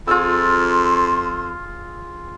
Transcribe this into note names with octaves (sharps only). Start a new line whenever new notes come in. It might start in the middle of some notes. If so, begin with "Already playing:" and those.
F2 F4 G#4 C6 E6